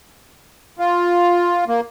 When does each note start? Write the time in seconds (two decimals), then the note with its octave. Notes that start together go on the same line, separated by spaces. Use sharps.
0.79 F4
1.68 A#3